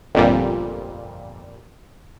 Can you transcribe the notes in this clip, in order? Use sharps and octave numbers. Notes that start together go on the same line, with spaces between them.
G1 F2 A#2 G3